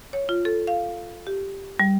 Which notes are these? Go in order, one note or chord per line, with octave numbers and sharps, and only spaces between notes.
C#5
F4
A4
F5
G4
G3